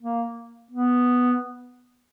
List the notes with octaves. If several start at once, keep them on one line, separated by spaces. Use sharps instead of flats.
A#3
B3